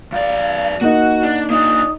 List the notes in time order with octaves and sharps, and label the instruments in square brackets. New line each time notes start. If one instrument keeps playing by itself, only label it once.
[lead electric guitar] F#2 D5 [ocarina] F5
[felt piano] A#3 D#4 [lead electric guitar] F#4 [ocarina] F#5
[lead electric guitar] D4
[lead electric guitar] A#3 D4 [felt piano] D#4 [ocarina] D#6